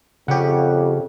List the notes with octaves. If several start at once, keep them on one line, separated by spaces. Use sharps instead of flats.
F2 C#3 G4 C#5 F#5